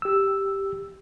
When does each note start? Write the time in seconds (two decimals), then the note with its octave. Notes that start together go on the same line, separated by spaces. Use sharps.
0.02 G4 E6